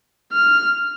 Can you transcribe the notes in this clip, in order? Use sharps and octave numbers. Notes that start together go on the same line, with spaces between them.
F6